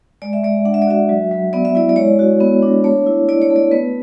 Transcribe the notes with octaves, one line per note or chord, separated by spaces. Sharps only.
G#3 D5
E5
G#3 D5
D4 F#5
E5
D5
F#4 E5
F#3
F#3
B3 D5
E5
E4 D5
D5
G#3 C#5
F#4
B3
D4
A3 C#5
E4
E4 D5
C#5
A3
D5
B3 B4